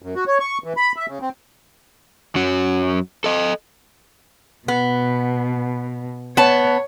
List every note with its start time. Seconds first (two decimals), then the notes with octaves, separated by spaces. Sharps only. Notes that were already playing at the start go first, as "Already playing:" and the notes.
0.02 F#2
0.15 F#4
0.27 C#5
0.40 C#6
0.64 E3
0.77 B5
0.96 E5
1.08 C#3
1.21 C4
2.35 F#2 F#3
3.24 A4 D#5
4.68 B2 B3
6.37 B3 C#5 A5